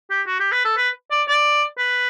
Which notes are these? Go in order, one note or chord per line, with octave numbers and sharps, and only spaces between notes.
G4
F#4
G4
B4
A4
B4
D5
D5
B4